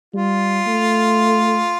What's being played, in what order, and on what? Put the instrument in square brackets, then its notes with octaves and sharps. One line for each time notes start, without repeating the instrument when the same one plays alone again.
[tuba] G3 [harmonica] F4
[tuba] A3